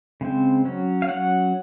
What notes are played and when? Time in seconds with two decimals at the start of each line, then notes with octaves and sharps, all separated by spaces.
0.21 C#3 G#3 C4
0.65 F#3 C#4
1.02 F5
1.08 F#3 C#4 F#5